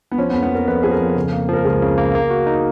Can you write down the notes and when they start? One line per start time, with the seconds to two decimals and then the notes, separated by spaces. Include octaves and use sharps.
0.12 B3
0.18 F3 C#4
0.30 B3
0.34 F2
0.43 B3
0.50 A#3 A#4
0.67 F2 B4
0.83 F3 G#4
0.91 A#4
1.00 F2
1.16 C#3
1.32 A#3
1.49 F3 A#4
1.65 C#2 G#4
1.82 C#3
1.98 A#3
2.15 A#3
2.30 F#4
2.46 D#4